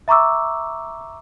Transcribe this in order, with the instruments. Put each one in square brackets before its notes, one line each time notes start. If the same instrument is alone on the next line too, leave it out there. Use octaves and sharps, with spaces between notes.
[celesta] E5 A#5 C#6 D6 E6